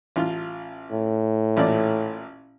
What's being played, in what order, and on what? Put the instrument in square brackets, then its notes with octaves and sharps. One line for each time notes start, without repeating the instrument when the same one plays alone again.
[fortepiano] A1 F4
[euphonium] A2
[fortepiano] A1 A#2 D5